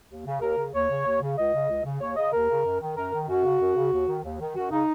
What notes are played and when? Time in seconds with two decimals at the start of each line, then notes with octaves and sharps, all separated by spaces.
0.10 D#2
0.26 C#3
0.41 D#2 A#4
0.58 C#3
0.73 D#2 C#5
0.89 C#3
1.06 D#2
1.21 C#3
1.37 C#2 D#5
1.54 C#3
1.69 C#2
1.84 C#3
2.00 D#2 C#5
2.16 C#3 D#5
2.32 D#2 A#4
2.49 C#3
2.65 F#2
2.80 D#3
2.96 F#2 A#4
3.13 D#3
3.28 F#2 F#4
3.45 C#3
3.60 F#2
3.76 C#3
3.92 D#2
4.07 D#3
4.23 D#2
4.40 D#3
4.55 F#2 F#4
4.71 C#3 D#4